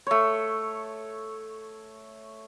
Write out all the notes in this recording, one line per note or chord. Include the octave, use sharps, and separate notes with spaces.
A3 C#5